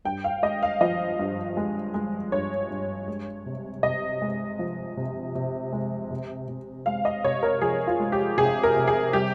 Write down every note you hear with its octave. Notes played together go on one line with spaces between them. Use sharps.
G2 G5
F5
G#3 D#5
F5
F3 D#5
G2
G#3
G#3
G2 C#5
G2
G#3
C3
C3 D#5
G#3
F3
C3
C3
G#3
C3
C3
G#3 F5
D#5
C3 C#5
A#4
F3 G#4
F4
G#3
G4
C3 G#4
A#4
C3
G#4
G3 G4